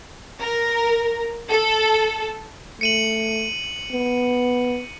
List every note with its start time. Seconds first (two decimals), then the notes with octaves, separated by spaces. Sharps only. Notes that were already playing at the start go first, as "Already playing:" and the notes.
0.41 A#4
1.49 A4
2.81 A3 C#7 D#7 F#7
3.92 B3